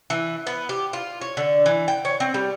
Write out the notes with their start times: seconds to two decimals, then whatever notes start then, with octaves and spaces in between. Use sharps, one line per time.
0.10 E3
0.47 B3
0.69 G4
0.93 F4
1.21 C#5
1.37 D3
1.66 E3
1.88 G5
2.05 C#5
2.20 C4
2.34 G3